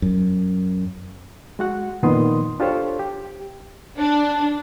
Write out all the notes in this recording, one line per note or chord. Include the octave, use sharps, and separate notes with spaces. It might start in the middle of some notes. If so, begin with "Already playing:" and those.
F#2
G#3 F#4 F#5
F2 A#2 D#3 B3 C6 D#6
D4 F4 G4 A4 C5 C#5
G4
D4